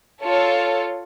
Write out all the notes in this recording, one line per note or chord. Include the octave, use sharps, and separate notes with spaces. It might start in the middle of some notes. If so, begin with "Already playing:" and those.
F4 A4 C#5